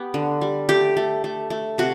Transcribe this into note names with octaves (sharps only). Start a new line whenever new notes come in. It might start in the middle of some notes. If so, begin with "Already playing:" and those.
Already playing: B3 G4
D3
G3
A3 G4
A3
A3
A3
C3 F#4